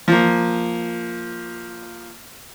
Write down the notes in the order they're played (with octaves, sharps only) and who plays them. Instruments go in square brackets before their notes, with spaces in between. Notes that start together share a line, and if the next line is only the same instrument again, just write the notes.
[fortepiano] F3 A#3